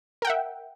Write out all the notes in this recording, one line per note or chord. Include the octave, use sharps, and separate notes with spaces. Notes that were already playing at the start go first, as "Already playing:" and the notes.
A#4 E5 F#5 G5